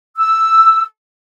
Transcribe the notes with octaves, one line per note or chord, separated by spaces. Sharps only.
E6